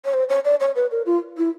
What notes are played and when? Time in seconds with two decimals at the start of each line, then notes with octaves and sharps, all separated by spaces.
0.05 C#5
0.14 C5
0.29 C#5
0.45 D5
0.60 C#5
0.76 B4
0.91 A#4
1.06 F4
1.37 E4